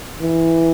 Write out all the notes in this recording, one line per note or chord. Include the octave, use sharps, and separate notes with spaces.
E3